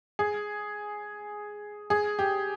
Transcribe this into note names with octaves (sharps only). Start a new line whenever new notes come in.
G#4
G#4
G4